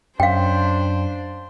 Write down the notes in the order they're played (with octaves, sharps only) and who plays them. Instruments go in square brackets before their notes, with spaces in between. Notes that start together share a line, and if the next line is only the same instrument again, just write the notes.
[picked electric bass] F#2 [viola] D4 C5 [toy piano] F5 G5